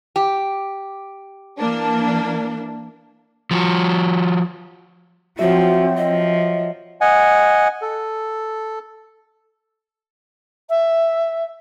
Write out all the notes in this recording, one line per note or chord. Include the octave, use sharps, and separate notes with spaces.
G4
E3 A#3 D4
F3 F#4
F3 F#3 C4 F#4 E5
F3 D#5
D#5 F#5 G#5
A4
E5